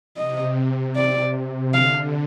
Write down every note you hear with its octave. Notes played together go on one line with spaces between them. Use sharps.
C3 D#5
D5
D3 F5